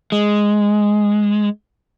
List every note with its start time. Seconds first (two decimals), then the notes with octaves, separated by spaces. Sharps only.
0.12 G#3